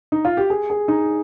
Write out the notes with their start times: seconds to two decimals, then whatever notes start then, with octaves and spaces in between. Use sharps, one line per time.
0.12 D#4
0.25 F4
0.37 G4
0.50 G#4
0.70 G#4
0.88 D#4